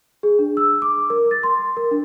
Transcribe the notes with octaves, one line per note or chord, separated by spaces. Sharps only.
G#4
D4
E6
D6
A#4
A6
C6
A#4
D4